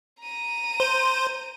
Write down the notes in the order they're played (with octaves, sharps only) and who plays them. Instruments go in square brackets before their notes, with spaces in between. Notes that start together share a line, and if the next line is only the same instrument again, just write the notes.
[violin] A#5 D#7
[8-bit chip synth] C5